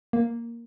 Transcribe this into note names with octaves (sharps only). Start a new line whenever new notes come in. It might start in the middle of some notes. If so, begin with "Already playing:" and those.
A#3